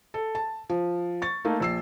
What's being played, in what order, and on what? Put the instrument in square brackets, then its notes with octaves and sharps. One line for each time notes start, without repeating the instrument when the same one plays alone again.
[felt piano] A4
A5
F3
C#6 A6
A3 A#3 D#4
A#1 E6 C7